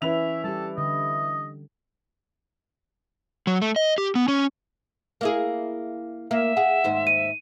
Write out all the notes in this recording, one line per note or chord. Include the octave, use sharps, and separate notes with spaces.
E3 C#4 E4 B4 E5 F7
G3 G4 A4
D3 D#5
F#3
A3
D#5
G4
B3
C#4
A#3 E4 G#4
A#3 E5
G#4 F#5
D#2 G#2 C5
D#7